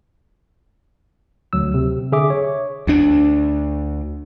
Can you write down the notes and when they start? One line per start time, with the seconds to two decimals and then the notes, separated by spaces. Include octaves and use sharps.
1.53 D2 F#3 E6
1.74 C3
2.12 D3 G#4 E5 D6
2.30 C#5
2.87 D2 D4